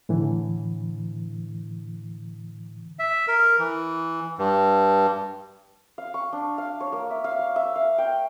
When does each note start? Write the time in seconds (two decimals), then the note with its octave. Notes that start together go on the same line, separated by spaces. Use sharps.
0.09 A2 D3 E3
2.99 E5
3.28 A#4
3.59 E3
4.39 G2
5.98 F5
6.14 C#6
6.33 D4
6.58 F5
6.80 C#5
6.92 A#3
7.11 E5
7.24 F5
7.39 F5
7.56 E5
7.76 F5
7.98 G5